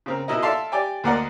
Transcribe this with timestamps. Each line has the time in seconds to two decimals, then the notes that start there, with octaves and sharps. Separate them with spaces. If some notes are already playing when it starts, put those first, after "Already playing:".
0.06 C#3 C4 A#4
0.28 B2 D#4 E4 A#4 D#5
0.43 A4 D5 E5 F5 A5 C6
0.72 G4 D5 G5 G#5
1.04 D2 A#3 A#4 D5 D#5 F#5